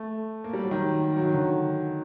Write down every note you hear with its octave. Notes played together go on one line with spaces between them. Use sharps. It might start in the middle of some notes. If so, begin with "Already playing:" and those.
Already playing: A3
A#3
G3
F#3
D#3
F#3
D#3
D3